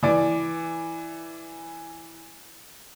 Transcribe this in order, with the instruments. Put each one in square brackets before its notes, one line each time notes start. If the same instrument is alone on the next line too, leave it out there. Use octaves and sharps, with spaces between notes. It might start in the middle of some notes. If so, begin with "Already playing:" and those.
[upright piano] E3 D5